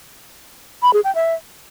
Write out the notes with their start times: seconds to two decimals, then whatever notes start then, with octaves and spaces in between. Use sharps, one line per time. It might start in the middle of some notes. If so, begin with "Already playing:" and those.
0.83 B5
0.93 G#4
1.04 G5
1.15 E5